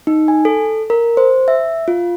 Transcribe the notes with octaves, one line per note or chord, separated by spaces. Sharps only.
D#4
G#5
A4
A#4
C5
E5
F4